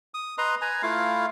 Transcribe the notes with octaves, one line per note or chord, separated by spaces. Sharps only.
D#6
B4 D#5 A#5 C6
B4 G#5 A#5
A3 E4 F4 F5